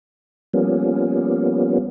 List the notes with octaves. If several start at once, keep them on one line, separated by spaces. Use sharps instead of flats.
F3 G3 A#3 B3 C#4